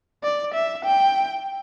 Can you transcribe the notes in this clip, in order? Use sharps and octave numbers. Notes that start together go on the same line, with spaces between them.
D5
E5
G5